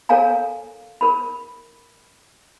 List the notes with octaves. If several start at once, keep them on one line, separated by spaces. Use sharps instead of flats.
A4 A#4 C#5 F5 G#5 A#5
A#4 B5